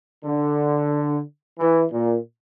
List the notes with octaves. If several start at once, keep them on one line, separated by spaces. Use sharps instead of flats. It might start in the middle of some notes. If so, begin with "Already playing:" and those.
D3
E3
A#2